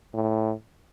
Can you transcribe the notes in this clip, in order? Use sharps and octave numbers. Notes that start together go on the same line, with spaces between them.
A2